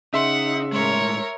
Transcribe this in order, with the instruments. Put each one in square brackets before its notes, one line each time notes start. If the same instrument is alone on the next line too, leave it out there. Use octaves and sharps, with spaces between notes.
[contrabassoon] C#3 [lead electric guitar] D#4 [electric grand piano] E5 C6 [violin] F#5
[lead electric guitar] A2 G#3 [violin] A#4 C#5